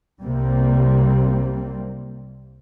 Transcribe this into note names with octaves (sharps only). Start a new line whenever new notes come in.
C2 C3 G3 A#3 C4